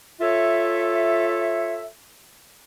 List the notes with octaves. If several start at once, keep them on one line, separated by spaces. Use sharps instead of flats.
F4 A4 C#5 E5